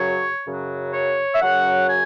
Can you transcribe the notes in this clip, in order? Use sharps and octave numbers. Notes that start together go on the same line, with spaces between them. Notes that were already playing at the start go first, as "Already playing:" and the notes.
Already playing: F#2 C#3 F#3 C#5
F#2 C#3 F#3
C#5
E5
F#2 C#3 F#3 F#5
G#5